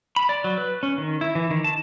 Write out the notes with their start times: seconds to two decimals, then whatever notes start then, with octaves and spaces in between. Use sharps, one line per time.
0.16 B5
0.29 D5
0.44 F#3
0.58 B4
0.83 C#4
0.98 D#3
1.21 E4
1.35 E3
1.51 D#3
1.64 A5